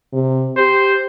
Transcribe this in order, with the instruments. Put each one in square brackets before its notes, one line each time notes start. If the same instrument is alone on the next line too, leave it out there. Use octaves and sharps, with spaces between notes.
[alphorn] C3
[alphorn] G4 [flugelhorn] C5